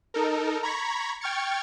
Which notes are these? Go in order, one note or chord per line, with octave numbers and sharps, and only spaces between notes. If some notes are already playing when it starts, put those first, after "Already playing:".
D#4 A4 A#4
A#5 B5 C#6 G#6 B6
G5 C#6 F6 G#6 A6 C#7